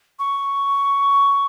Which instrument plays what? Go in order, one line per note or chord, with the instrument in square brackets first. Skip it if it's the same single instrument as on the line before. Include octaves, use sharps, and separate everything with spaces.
[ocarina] C#6